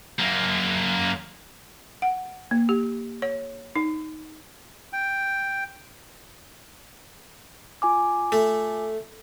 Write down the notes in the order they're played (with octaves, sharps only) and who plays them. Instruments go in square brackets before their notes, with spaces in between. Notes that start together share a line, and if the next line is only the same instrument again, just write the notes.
[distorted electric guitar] F#2 A#3
[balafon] F#5
A#3
G4
C#5
D#4
[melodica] G5
[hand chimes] F4 G#5 D6
[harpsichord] A3